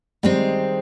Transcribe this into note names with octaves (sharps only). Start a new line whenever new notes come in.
D#3 G3 G#3 C4